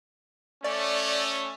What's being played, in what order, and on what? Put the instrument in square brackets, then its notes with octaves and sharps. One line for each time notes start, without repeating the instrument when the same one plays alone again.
[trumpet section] A3 C#4 [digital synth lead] D5